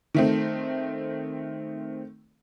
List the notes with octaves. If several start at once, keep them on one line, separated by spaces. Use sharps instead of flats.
D#3 A3 C4